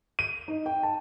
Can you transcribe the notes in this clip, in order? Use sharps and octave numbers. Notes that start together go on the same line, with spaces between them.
D#7
D#4
G5
A5